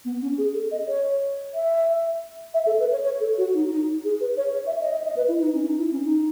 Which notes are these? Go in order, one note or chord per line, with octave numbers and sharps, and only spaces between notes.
B3
C#4
G#4
A4
D#5
C#5
E5
E5
A4
B4
C#5
C#5
A4
F#4
D#4
D#4
G#4
B4
C#5
C#5
E5
D#5
E5
D#5
B4
E4
D#4
C#4
D#4
E4
C#4
D#4